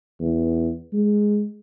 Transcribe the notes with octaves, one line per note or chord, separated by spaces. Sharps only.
E2
G#3